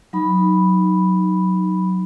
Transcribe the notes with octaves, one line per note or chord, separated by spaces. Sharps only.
F#3 D#4 B5